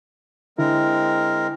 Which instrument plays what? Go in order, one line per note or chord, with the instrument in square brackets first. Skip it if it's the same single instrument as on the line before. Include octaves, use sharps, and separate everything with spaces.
[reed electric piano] D3 E4 [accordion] G#3 C4 A#4